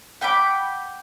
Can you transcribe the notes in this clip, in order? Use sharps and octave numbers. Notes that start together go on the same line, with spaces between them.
F#5 G5 B5 D6